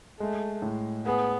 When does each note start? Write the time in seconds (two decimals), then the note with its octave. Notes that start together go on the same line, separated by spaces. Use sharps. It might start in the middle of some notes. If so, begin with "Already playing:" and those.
0.20 G#3 A3
0.62 A2
1.06 B3 G#4